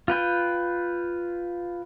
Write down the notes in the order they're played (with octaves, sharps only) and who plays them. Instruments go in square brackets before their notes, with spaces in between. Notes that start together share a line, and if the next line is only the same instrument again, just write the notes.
[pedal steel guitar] F4 B4 G5